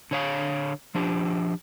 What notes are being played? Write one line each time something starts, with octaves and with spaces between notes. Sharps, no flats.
D3 C#5 F5
F3 D4 G4